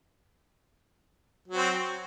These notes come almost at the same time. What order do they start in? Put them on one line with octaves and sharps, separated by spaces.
F#3 F#4 C4